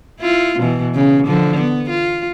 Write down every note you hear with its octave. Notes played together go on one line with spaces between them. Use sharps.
E4 F4
B2 E3
C#3
D3 F3
B3
F4